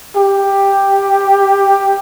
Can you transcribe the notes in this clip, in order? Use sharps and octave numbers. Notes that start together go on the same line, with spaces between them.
G4